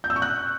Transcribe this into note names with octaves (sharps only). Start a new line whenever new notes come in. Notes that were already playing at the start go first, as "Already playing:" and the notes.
G6
E6
C#6
F#6